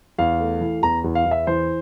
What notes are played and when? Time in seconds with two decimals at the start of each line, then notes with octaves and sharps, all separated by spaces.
0.18 E2 F5
0.40 A3
0.61 E3
0.82 E2 A#5
1.04 E2
1.15 F5
1.26 E2
1.31 E5
1.47 E3 C5